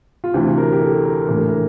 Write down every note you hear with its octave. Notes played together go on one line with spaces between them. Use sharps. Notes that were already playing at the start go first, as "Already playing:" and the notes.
F4
D2 C3 E3 G4
A#4
G4
A4
A#4
A#1 A2 E3 A#4
A4
A#4